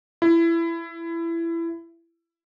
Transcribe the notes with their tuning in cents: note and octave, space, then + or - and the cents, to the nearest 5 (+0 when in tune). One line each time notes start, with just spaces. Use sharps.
E4 +20